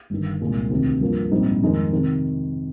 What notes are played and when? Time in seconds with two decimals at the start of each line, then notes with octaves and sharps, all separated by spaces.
0.10 G1 G2 D#3
0.41 C2 A#2 G#3
0.70 D2 C3 D#3
1.01 G2 F3 A#3
1.31 A#1 G#2 G3 C4 D#4
1.61 F2 D#3 G#3 D#4 A#4
1.92 C3 D#3